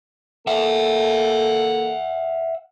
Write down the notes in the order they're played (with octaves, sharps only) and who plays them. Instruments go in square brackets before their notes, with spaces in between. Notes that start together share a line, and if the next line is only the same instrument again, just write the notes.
[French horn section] A#3 A4 [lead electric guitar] E5 F#5